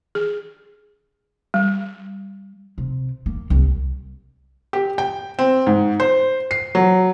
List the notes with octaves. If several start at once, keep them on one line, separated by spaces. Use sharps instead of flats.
G#4
G3
C3
A#3
C2
G4
G5
C4
G#2
C5
C7
F#3